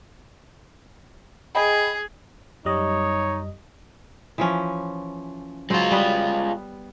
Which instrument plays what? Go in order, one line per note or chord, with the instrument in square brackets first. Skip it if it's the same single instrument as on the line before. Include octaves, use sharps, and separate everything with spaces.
[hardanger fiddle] G#4 [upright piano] D#5 G5 B5
[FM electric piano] F#2 G3 D#5 [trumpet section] D#4 C#5
[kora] E3 F3 C#4
[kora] F#3 C5 [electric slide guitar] G#3 F4
[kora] G3 B3